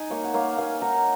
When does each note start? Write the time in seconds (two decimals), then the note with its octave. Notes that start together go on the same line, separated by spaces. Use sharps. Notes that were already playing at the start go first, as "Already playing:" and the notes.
Already playing: D#4 G#5
0.10 A#3 C#5 F5
0.24 F#5
0.34 A#3 C#5 F5
0.57 A#3 F5 G#5
0.81 D#4 F#5 A#5